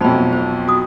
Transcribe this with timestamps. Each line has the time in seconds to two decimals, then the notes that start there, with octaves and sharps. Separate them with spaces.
0.01 B1 F2 D#4 C5 B5
0.33 C5
0.68 F#4 D#6